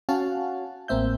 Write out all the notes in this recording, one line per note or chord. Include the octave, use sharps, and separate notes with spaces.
C#4 F#4 F5 F#5 G#5 A5
A1 A#3 C4 E5 G6